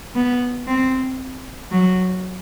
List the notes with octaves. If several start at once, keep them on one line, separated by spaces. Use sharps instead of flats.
B3
C4
F#3